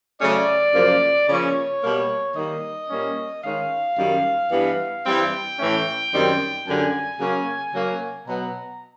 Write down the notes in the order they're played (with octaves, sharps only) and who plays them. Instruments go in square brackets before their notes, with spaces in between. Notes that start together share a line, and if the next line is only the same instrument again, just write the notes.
[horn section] C#3 F#3 A3 C#4 D5
F#2 C#3 F3 A#3
C#3 F3 A#3 C#4 C#5
B2 G3 A#3
D#3 G3 A#3 D#5
A#2 G3 A#3 C#4
D#3 G#3 C#4 F5
F#2 D#3 G3
G2 E3 G3 B3
G2 E3 G3 C4 G5
A2 E3 A3 C#4
F#2 D#3 G3 C4
F#2 D3 G3 G#5
C#3 F#3 A#3 C#4
C#3 F#3 A#3 C#4
B2 F#3 B3 A#5